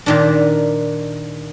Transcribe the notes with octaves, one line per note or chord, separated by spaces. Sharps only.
A#2 D#3 D4